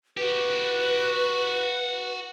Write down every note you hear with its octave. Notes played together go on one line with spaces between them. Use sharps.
F#4 G4 B4